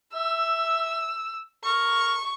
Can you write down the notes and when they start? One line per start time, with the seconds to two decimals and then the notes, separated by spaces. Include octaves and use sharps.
0.14 E5 E6
1.65 A#4 C#6